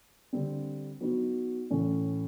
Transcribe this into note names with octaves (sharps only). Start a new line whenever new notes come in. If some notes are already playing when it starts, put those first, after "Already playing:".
D3 G3 C4
F#3 B3 D#4
A2 E3 A3 C#4